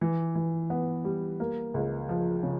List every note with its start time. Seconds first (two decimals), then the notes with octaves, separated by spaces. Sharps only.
0.01 E3
0.35 E3
0.70 B3
1.04 G3
1.40 A#3
1.74 C#2
2.09 F3
2.43 C#3